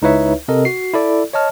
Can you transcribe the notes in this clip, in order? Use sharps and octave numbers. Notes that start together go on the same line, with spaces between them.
C#2 D#4 E4 B4 C#5 E5
C3 C4 A4 A#4 D#5
F#4 C7
E4 A4 D5
C#5 D#5 A5 F6